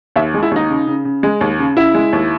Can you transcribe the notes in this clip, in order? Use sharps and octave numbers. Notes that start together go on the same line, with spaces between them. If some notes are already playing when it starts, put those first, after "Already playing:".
D#2 E5
G#3
E4
D#2 D#4
C#3
C#3
C#3
G#3
D#2
C#3
C#3 E4
G#3
D#2